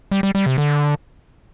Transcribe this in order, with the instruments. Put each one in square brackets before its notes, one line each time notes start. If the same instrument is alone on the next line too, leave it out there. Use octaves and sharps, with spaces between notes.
[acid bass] G3
G3
G3
C3
D3